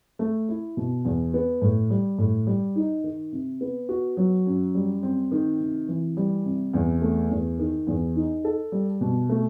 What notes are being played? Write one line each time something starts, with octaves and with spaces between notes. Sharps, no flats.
A3
E4
B2
E2
B3
A2
G3
A2
G3
D#4
D#3
C3
B3
F#4
F#3
F#2
G3
C4
D#3
C3
E3
G3
C3
E2
A3
E2
D#3
E2
D#4
A4
G3
B2
A3